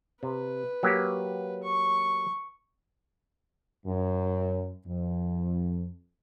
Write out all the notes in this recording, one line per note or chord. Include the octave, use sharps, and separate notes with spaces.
C3 B4
F#3 A#3 G4
C#6
F#2
F2